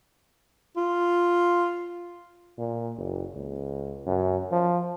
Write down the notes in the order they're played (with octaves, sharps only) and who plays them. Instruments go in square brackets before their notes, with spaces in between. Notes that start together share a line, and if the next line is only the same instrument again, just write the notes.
[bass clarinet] F4
[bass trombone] A#2
F#1
C#2
F#2
F3